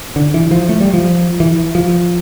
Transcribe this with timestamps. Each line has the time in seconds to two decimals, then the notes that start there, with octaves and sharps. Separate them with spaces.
0.16 D3
0.34 E3
0.51 F3
0.69 A3
0.81 G3
0.94 F3
1.40 E3
1.75 F3